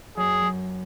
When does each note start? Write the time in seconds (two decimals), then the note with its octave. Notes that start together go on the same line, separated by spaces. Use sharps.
0.17 F#2 G#4
0.42 F#2